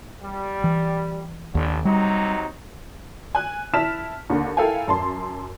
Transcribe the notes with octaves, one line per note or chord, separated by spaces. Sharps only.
G3
E3
A1 D#2 D3
C3 F#3 G3 D#4
G#5 F#6
E4 A5 F6 B6 E7
D#2 D3
E4 A4 A#4 F5 G5 G#5
F#2 A5 C6